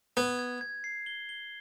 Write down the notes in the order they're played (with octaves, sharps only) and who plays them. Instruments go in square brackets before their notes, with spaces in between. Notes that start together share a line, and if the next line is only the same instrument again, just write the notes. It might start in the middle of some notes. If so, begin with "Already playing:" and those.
[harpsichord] B3 [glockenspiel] G#6
[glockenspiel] G#6
G#6
C7
G7
G7